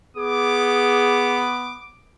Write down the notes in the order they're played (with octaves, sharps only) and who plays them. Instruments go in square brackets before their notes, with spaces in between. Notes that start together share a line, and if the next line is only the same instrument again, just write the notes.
[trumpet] B3 [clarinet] G#4 [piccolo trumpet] D6